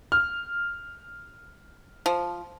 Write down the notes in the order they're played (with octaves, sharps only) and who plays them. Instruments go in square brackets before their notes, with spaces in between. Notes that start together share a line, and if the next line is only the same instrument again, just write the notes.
[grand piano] F6
[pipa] F3